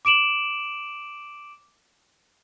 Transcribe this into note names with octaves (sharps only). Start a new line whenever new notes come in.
D6 D7 E7 F#7